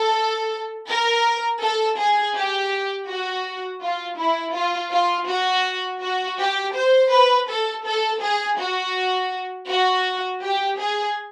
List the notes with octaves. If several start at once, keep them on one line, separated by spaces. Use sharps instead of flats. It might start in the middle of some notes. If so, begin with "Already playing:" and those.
Already playing: A4
A#4
A4
G#4
G4
F#4
F4
E4
F4
F4
F#4
F#4
G4
C5
B4
A4
A4
G#4
F#4
F#4
G4
G#4